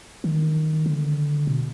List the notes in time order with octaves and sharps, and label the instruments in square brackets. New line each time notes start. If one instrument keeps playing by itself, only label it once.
[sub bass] D#3
D3
B2